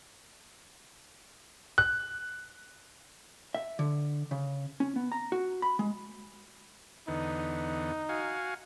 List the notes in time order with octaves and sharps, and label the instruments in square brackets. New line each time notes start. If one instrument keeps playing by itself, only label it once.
[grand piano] F#6
[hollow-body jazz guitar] E5
D3
C#3
C#4
B3
A#5
F#4
B5
G#3
[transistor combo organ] E2 D3 B3 [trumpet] D#4
[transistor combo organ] F#4 F5 G#5